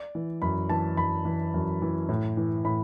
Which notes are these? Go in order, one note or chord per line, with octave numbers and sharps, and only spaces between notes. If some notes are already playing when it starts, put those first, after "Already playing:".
Already playing: D5
E3
F#2 B5
E3 A5
F#2 B5
E3
F#2
E3
A2
E3
A2 B5